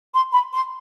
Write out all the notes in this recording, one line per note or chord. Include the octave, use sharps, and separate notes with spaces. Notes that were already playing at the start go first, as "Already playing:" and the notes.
C6
B5
C6